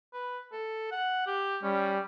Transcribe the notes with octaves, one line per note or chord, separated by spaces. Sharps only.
B4
A4
F#5
G4
G3 C#4